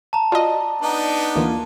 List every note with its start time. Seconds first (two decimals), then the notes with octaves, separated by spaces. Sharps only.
0.13 A5 A#5
0.32 F4 F#4 D5 D#5
0.82 B3 D4 D#4
1.35 D2 E3 A#3 F4